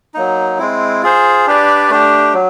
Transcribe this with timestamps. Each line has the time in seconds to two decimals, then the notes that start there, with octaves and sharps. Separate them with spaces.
0.14 F#3 A#3 D#4
0.58 G#3 C4 E4
1.03 F4 G#4 C5
1.47 D4 G4 B4 D5
1.90 A3 D4 G4
2.34 F#3